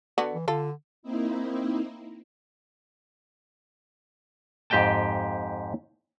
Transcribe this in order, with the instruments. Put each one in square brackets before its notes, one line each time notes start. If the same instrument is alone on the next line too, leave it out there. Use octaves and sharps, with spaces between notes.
[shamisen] D3 B3 F#4
[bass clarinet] E3
[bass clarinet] D3 [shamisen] F4 A4
[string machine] A#3 C4 D#4 E4
[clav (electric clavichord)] F2 G#2 G4 D#5 G5 A5